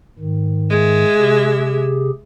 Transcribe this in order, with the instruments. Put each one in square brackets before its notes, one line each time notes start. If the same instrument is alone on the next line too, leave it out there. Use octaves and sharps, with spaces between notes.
[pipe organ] G#2 D#3
[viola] G#3 E5
[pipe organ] C3 G4 G#4